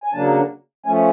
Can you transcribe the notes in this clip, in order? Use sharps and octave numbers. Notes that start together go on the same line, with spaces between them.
G#5
C#3 F#3 A#3 D4 A5
F3 A3 C#4 G#5